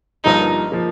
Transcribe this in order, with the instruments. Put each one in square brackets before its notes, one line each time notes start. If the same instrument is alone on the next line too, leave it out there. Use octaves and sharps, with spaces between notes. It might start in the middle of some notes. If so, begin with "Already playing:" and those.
[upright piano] G1 G2 F3 A#3 [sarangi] D#4
[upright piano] F3 A#3